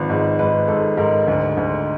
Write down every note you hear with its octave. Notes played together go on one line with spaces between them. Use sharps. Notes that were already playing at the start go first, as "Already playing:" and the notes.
Already playing: G#1 F3 B4
G#2
G#2 B4
G#2 A4
G#2 A#4
D2
D2